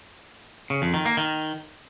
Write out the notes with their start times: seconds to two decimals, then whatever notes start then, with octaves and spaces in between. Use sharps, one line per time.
0.70 C#3
0.82 F2
0.94 D#3
1.06 A#3
1.17 D#3